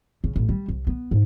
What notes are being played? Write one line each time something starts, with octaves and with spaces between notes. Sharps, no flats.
C#3
A1
G3
C2
B3
G#2